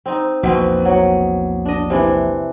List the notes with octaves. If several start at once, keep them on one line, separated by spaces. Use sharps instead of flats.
C4 D#4
A#1 E2 B2 C4
F#3
D4 D#5
C3 E3 D4